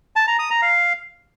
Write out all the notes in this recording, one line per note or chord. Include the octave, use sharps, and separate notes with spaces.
A5
A#5
D#6
A#5
F5